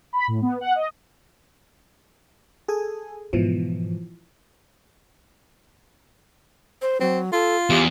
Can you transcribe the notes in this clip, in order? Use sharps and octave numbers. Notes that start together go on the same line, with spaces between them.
B5
A2
B3
F#5
D#5
G#4 A4 G#5
G#2 B2 E3 F3
C5
F#3 C4
F4 A4
E2 G4